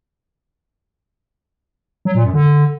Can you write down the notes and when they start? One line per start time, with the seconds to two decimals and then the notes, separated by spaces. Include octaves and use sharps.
2.05 F#3
2.15 A#2
2.24 F#2
2.34 D3